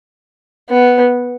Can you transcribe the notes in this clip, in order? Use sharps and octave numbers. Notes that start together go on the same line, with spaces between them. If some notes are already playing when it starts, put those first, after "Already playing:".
B3